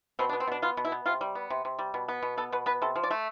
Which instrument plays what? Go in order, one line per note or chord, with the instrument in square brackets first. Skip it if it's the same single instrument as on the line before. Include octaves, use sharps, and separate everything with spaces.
[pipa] B2 C4
D4
B3
C4
B2 D4
B3 F4
B2
E4
B3
C3 F4
G3
B3
C3
C3
G3
B2
B3
B2
B3 A4
B2 B4
B3 B4
C3 A4
F3
D5
A3